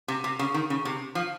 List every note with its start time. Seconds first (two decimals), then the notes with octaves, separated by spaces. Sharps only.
0.08 C3
0.24 C3
0.39 C#3
0.54 D#3
0.70 C#3
0.85 C3
1.15 F3